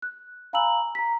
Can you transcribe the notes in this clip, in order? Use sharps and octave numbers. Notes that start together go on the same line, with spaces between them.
F#6
F5 G#5 A#5 B5 E6 F#7
A#5 B6